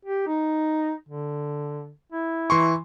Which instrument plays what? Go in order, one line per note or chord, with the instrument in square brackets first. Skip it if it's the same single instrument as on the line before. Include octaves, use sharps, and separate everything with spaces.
[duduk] G4
D#4
D3
E4
[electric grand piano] E3 C6 C#6